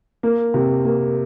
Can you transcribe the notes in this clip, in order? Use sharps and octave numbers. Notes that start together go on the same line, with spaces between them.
A#3
C3
A#3